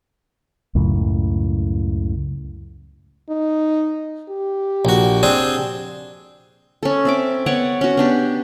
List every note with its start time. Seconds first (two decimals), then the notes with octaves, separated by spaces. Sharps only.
0.75 C#2 F#2 A2
3.30 D#4
4.29 G4
4.85 A#1 F#4
5.23 C4 D4 G#4
6.83 C#4 A4
7.05 C4 E5 D6
7.46 B3 C#5 D5 F#5
7.81 C#4 F#4
7.97 B3 D4 G4